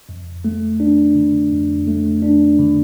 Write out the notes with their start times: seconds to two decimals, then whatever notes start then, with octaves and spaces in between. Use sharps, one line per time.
0.09 F2
0.45 A3
0.80 D4
1.15 D3
1.51 F2
1.87 A3
2.22 D4
2.59 D3